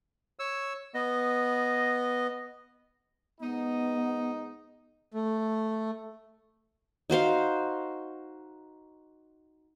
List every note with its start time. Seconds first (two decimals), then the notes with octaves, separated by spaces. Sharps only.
0.39 C#5 E6
0.94 B3 D#5
3.41 G#2 B3 D#4
5.12 A3
7.10 D#4 F#4 C5 F5